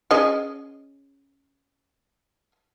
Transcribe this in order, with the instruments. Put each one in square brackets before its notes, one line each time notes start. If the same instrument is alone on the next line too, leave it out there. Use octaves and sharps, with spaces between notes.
[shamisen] C#4 G#4 D#5